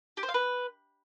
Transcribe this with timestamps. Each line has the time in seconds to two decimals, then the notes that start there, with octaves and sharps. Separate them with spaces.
0.17 G4
0.23 C5
0.29 F5
0.34 B4